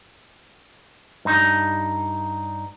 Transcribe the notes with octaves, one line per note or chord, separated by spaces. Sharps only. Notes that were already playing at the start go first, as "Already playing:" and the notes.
G2 D#4